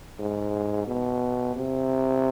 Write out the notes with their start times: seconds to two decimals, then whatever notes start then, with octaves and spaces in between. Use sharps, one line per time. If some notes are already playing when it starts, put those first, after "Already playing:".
0.19 G#2
0.87 B2
1.56 C3